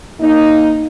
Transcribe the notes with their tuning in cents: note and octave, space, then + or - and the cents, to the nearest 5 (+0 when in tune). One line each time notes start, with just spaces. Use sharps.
A#3 +0 D#4 +0